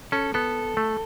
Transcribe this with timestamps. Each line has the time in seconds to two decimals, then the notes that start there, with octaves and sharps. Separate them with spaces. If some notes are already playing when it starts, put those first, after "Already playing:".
0.12 C#4 A4
0.34 B3 A4
0.77 A3